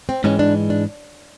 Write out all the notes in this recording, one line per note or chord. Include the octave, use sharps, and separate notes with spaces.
C4
G#2 E3 G#3 C#4
D4
D4